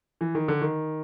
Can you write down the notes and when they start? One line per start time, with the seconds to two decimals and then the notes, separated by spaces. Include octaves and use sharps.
0.21 E3
0.35 D#3
0.48 D3
0.62 D#3